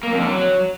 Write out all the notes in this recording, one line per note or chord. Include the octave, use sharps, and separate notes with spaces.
A#3
F2
D3
F#3